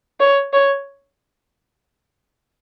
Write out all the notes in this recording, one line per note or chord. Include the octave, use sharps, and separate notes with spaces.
C#5
C#5